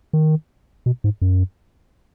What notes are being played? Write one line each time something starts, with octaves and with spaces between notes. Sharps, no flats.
D#3
B2
G#2
F#2